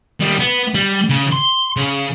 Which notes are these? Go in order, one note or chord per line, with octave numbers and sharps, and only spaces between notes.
D#3 G3
B3
G3
C#3
C6
C#3